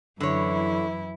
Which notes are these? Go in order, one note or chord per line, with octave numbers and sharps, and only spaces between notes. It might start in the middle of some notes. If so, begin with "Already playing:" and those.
F#2 D3 E3 E4 C#5